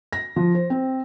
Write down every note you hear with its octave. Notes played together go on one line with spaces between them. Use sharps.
A#6
F3
C5
C4